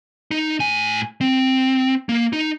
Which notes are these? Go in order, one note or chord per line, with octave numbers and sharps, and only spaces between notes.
D#4
A2 G#5
C4
A#3
D#4